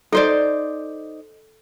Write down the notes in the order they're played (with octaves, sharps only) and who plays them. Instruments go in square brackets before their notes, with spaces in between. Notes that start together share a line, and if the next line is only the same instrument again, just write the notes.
[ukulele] D#4 C5 D5 [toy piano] A4